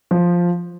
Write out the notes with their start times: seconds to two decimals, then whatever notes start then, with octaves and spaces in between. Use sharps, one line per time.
0.11 F3